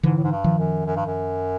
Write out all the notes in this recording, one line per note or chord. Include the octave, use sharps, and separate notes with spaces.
G#2 D3 E3
A2
G#2
G2
D#3 F3
F#2
F#2
G2
F#2